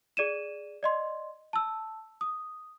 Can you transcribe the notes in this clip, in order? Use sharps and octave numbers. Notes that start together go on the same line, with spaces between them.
G#4 D5 D#7 E7
D5 D#5 C6
A5 E6
D#6